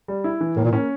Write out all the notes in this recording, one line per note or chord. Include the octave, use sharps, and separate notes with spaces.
G3
E4
E3
A2 A#3
A#2
A2 C#4